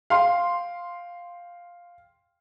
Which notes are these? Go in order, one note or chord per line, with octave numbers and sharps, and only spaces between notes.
F5 G5 C6